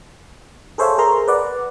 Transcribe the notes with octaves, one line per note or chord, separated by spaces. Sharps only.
G#4 A4 C5 C#5 E5 F5
G#4 A#4 A#5 C6
B4 D5 F#5